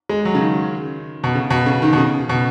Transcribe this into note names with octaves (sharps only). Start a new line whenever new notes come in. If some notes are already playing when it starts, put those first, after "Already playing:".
G#3
F#3
C#3
D#3
B2
C#3
B2
C#3
D#3
B2
C#3
B2